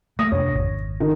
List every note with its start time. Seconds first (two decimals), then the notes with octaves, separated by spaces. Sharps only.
0.19 A3 A#3 D#6 A#6
0.32 F2 C3 D4 C#5
0.54 G#1
1.00 D#3